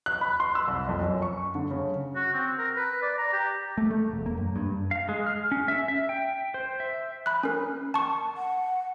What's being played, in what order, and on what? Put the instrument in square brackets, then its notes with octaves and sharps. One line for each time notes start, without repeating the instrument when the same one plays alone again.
[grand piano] F#6
B5
C6
E6
C2
F2
F#2
C#6
D3
C#3
[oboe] F#4
C4
A#4
B4
D5
A#5
G4
[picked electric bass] A3
A3
E1
A#3
F#2
G2
[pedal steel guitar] F5
G#3
F6
C#4
E5
E5
G5
C5
E5
[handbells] B5 F#6
C#4 A#4
A5 C#6
[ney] F#5